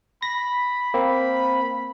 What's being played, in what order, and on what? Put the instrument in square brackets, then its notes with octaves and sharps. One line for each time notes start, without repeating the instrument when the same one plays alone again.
[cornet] B5 [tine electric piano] A#6
[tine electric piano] A#3 C4 [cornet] B5